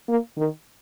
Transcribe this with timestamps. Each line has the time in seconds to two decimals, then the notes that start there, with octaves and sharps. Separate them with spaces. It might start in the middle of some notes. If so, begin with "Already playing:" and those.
0.09 A#3
0.38 D#3